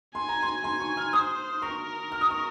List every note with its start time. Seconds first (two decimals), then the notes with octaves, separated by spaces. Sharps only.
0.15 G#5 C6
0.29 A#5
0.42 C6
0.64 G#5 C6
0.80 C#6
0.97 F6
1.13 C5 D#6
1.62 A#4 C#6
2.12 F6
2.21 D#6
2.30 C#6